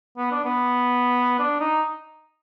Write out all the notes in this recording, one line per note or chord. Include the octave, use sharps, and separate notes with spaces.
B3
D4
B3
D4
D#4